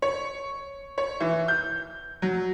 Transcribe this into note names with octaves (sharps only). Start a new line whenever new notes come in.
C#5
C#5
E3
G6
F#3